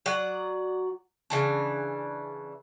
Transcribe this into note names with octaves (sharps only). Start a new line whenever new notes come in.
F#3 D5 F#5
C#3 E3 D4